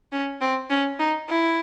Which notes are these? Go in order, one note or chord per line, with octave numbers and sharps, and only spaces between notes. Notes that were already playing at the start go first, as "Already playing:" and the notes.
C#4
C4
C#4
D#4
E4